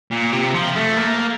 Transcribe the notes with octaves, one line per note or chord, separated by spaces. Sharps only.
A#2
C3
F3
A3
A#3